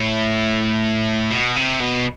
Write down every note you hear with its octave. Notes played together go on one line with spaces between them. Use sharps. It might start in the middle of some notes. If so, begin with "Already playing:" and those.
Already playing: A2
B2
C3
B2